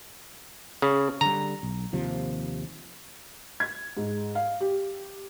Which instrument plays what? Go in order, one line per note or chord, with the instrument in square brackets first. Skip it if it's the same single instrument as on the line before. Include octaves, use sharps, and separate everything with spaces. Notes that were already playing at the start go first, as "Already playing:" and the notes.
[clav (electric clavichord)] C#3
[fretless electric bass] D3 G3 [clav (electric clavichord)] A#5
[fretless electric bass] B1
D#2 C3 F3
[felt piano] G#6
G#2
F5
G4